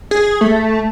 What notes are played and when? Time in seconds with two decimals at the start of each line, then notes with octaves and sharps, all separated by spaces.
0.11 G#4
0.41 A3